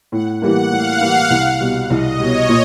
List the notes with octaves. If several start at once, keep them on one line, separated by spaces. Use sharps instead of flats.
A2 F#5
E3 G3 A#3 F#5
A2 F5
E3 G3 A#3
C2
B2 G3
C2 D#5
B2 G3 C#5
A#2